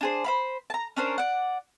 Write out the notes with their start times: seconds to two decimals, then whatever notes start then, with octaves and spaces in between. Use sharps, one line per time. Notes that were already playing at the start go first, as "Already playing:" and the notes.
0.01 D4 G#4 C5
0.24 C5 F5 B5
0.70 A5 A#5
0.96 C#4 D4 A#4 C5
1.18 D5 F#5